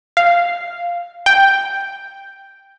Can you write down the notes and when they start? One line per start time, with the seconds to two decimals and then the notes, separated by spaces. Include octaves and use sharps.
0.17 F5
1.26 G5